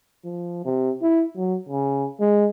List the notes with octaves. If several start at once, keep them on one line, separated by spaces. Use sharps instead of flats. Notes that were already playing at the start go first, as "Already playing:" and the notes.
F3
C3
E4
F#3
C#3
G#3